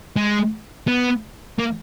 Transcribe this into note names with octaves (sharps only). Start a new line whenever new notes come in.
G#3
B3
A#3